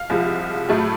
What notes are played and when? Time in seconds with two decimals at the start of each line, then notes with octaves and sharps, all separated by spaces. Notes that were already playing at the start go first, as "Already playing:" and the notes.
Already playing: F5
0.10 C2 C3 F3 G#3
0.69 A2 F#3 A3